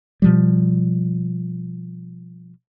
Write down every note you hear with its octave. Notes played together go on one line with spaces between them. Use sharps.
B2 F3 G3